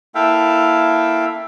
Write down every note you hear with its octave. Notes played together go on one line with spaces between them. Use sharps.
A#3 E4 A4 E5 F5 G5